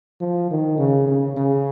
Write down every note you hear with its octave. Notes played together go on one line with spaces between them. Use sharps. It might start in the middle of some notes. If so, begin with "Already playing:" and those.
F3
D#3
C#3
C#3
C#3